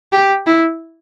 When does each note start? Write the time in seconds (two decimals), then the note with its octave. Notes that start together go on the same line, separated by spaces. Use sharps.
0.12 G4
0.47 E4